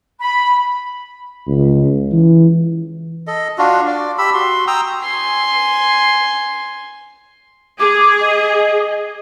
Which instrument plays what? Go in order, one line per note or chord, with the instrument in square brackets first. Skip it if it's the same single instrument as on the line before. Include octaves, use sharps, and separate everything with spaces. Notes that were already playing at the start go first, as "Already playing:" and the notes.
[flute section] B5
[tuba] C#2
E3
[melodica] A4 D#5
D4 F4 F#4
D5
G4 B5 E6
F#4 C6
G5 A#5 D#6 E6
[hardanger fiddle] G#5 C6
[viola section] G#4 [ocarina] D6
[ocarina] D#5